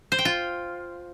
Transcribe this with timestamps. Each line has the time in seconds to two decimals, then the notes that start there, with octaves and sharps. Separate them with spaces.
0.12 C5
0.18 G5
0.25 F4